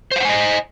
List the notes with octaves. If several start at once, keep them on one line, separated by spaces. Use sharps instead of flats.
C5 D#5 F5 F#5 G#5